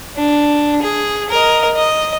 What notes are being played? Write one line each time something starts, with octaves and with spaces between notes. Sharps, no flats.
D4
G#4
A#4 D#5
D#5